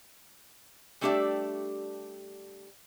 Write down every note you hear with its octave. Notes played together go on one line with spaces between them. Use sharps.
G3 A3 D4 G4 D5 E5